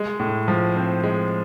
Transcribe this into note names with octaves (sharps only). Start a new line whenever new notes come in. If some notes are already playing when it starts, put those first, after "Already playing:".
Already playing: G#3
A2
F3
C4
G#3